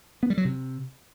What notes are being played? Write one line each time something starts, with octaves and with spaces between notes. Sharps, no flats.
B3
G3
F#3
C3